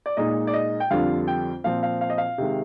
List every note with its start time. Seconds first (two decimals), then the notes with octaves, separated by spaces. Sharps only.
0.06 D5
0.17 A#2 G#3 D#4 D#5
0.47 D5
0.53 D#5
0.80 G5
0.90 F2 D3 G3 D4 F4 F5
1.27 G5
1.64 A#2 F3 C4 F5
1.83 F5
2.01 F5
2.10 D#5
2.18 F5
2.38 C3 D#3 G#3